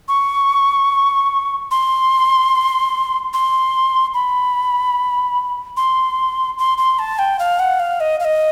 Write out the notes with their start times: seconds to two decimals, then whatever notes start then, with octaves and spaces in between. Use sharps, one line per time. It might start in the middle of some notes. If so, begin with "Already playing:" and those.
0.08 C#6
1.71 C6
3.33 C6
4.14 B5
5.77 C6
6.58 C6
6.78 C6
6.99 A5
7.19 G5
7.39 F5
7.59 F#5
7.80 F5
8.00 D#5
8.20 F5
8.25 D#5